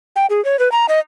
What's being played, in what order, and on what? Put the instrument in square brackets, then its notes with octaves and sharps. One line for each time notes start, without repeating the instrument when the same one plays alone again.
[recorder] G5
G#4
C#5
B4
A#5
D#5